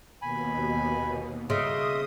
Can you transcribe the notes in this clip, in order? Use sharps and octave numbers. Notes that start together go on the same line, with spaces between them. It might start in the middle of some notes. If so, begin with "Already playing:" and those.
D#2 B2 G#5 B5
C#3 D#5 E5 C6 D#6